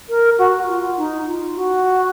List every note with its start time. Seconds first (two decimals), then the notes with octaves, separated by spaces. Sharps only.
0.09 A#4
0.38 F#4
0.68 F4
0.97 D#4
1.26 F4
1.56 F#4